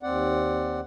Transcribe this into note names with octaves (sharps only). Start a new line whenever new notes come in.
D#2 C4 D5 F#5